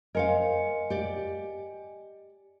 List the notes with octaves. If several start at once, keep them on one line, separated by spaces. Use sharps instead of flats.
A#4 C5 D#5 F5 G#5 C#7
G4 D5